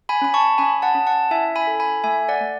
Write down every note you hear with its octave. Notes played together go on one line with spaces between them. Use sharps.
G#5 B5
C#4 B5
A5 C#6
C#4 G#5 B5
F#5 A5
C#4
F#5 A5
E4 E5 G#5
G#5 B5
A4
G#5 B5
A3 E5 G#5
D5 F#5
A3